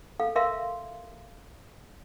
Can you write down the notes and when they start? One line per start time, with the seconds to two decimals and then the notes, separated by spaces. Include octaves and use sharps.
0.20 A4 F5
0.36 A#4 E5 F5 C6